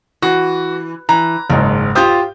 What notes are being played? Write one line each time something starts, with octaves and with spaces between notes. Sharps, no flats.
E3 F#4
E3 A#5
F#1 G#2 D#3
F4 G4 C5 D#6 G6